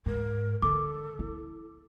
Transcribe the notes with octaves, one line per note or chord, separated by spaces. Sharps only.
G#2 A#4
D3 A4 D6
E4